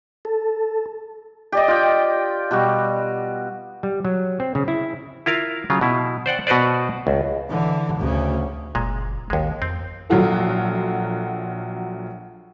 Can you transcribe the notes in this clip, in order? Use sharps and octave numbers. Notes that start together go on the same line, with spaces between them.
A4
G4 D5 D#5
F4 G5
B2 G3 F#4
G3
F#3
C4
C#3
E4
E4 F4 A#4 F5
C#3 F#3 F4
B2 E4
C5 D5 F#5 G5
B2 F#4 B4 C5 D5
C#2
D3 E3
D2 C#3
F#1 A#2 G#3
A1 D#2 G#3
F2 C4
A#1 F#3 F4 F#4 A4